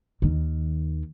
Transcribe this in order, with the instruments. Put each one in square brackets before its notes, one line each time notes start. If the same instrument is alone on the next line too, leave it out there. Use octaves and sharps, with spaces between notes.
[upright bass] D#2 D#3